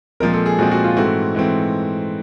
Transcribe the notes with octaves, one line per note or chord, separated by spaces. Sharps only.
A#2 F3 G#3 C4 A#4
A4
G#4
A#2 F3 G#3 C4 F#4
F#4
F4
G#2 E3 A3 C4 F#4
G#2 E3 A3 C4